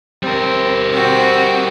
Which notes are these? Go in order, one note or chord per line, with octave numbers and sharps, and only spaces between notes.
G3 C4 A#4
C4 F#4 G5